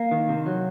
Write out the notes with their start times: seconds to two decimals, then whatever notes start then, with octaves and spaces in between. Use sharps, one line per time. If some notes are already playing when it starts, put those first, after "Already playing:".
Already playing: A#3
0.11 D#3
0.29 C3
0.46 F#3